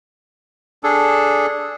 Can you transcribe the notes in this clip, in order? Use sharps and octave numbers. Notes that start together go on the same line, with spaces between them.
D4 G#4 A4